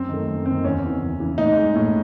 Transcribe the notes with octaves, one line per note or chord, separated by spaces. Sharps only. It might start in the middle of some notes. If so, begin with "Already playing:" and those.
Already playing: F#2 C4
D#3 A3
F#2
D#3 A3 C4
E2 C#4
C#3 E3
E2
C#3 E3
A2 D#4
G#3
A2